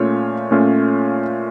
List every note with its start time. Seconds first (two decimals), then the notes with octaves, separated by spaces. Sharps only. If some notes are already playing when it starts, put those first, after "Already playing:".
Already playing: A#2 A3 C#4 F4 C#5
0.51 A#2 A3 C#4 F4